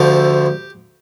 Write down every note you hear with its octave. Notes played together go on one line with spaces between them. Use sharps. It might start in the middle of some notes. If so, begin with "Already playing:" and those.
Already playing: D2 D3 F3 G4